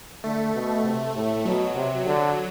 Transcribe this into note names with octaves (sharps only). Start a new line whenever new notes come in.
D3 A3
B2
C3
A2
B2 F#3
C3
D3 F#3